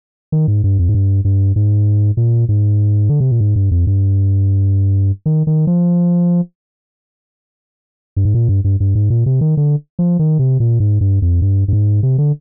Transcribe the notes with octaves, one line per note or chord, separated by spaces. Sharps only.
D#3
G#2
G2
F2
G#2
G2
G2
G#2
A#2
G#2
D3
C3
A#2
G#2
G2
F2
G2
D#3
D#3
F3
G2
G#2
A#2
G2
G2
G2
G#2
A#2
C3
D#3
D3
F3
D#3
C3
A#2
G#2
G2
F2
G2
G2
G#2
C3
D3